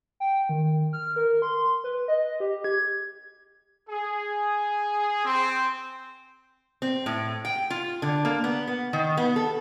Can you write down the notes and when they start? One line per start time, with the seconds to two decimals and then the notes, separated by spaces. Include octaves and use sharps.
0.20 G5
0.49 D#3
0.93 F6
1.16 A#4
1.42 C6
1.84 B4
2.08 D#5
2.40 G4
2.64 G#6
3.88 G#4
5.24 C4
6.82 C4
7.06 A2
7.45 G5
7.70 F4
8.02 D3
8.25 A#3
8.44 B3
8.68 B3
8.93 D#3
9.17 B3
9.36 A4